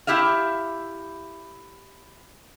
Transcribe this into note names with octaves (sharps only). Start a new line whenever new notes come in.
E4 G4 E5 F5